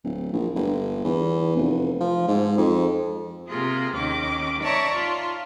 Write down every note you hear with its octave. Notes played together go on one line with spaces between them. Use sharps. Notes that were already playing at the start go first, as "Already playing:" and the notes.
D1
A#1
G1
E2
F1
F3
G#2
F2
C3 A#3 F4 G#4
D#2 D#3 C#4 D6
C#5 D5 E5 A5 A#5 C#6
F4